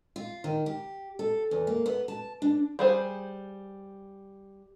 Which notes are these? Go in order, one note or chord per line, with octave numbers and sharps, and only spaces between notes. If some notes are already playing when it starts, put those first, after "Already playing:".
F4
D#3
G4
A4
E2
A#3
B3
A5
D4
G3 G#4 C5